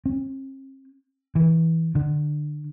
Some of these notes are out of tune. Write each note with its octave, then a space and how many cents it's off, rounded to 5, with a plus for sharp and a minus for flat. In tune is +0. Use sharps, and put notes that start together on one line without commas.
C4 +45
E3 -15
D3 +25